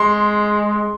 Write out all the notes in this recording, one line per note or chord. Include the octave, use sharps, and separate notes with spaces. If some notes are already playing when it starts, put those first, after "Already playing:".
Already playing: G#3 C6